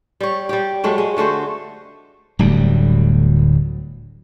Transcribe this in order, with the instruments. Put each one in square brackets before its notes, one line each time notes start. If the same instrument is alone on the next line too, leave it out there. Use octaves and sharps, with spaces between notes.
[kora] G3 C#5
G3 G4
F#3 G#3 A3
G#3
D3 A3 F#4 C5
[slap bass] D1 D2 G3